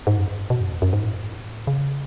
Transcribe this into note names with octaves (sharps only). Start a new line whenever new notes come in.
G#2
F#2
G#2
B2
F#2
E2
F#2
G#2
A2
C#3